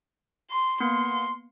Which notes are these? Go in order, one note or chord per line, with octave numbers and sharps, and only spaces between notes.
C6
A#3 B3 C6 C#7